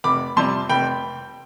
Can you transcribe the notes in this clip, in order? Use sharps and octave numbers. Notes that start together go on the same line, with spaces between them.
F1 B5 D6
F2 C3 G3 A5 C6
F1 G5 B5